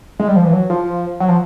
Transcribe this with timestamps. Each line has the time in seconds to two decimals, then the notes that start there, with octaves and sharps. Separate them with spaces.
0.20 G#3
0.28 G3
0.36 F3
0.44 E3
0.53 F#3
0.70 F3
1.20 F#3
1.28 F3